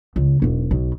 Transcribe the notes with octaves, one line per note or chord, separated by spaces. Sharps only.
C#2
E1 B1
B1